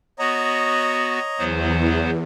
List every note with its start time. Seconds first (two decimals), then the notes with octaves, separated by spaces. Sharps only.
0.19 B3 F#4 C#5 D#5 A#5
1.38 E2 F#3 B3 C5